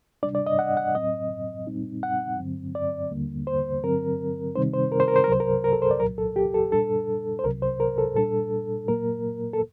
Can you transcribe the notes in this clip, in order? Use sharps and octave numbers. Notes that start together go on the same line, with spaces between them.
C3 G3 D4 D5
D5
D#5
F#5
F#5
A2 F#3 C4 D#5
A#2 G3 C4 D#4
F#5
G2 D3 F#3 C4
D5
D#2 D3 G3 A#3
C5
G2 D3 F#3 C4 A#4
C3 D#3 G3 C4 D#4 C5
C5
A#4
C5
A#4
C5
A#4
C2 C3 F#3 C5
A#4
A#4
A4
C5
D5
C2 A#2 F#3 A#4
A4
G4
A4
A#2 G3 D4 A4
C5
C2 C3 F#3 A#4
C5
A#4
A4
A#2 G3 D4 A4
A#2 F#3 A#3 A#4
A4